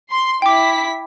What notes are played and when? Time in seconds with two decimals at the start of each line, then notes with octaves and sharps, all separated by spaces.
0.11 C6
0.42 E4 G5 D6 B6